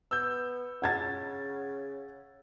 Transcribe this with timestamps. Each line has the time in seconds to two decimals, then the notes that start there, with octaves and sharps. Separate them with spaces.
0.11 B3 E6 G6
0.82 C#3 F#5 G#6 A6